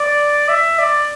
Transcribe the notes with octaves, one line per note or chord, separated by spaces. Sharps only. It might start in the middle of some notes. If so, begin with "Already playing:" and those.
Already playing: D5
E5
D5